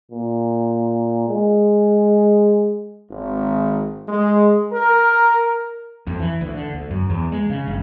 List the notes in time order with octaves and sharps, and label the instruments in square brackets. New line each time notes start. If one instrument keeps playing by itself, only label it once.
[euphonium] A#2
G#3
[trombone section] G#1
G#3
A#4
[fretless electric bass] F2
E3
D2
D3
D2
F#2
E2
G#3
C#3
G1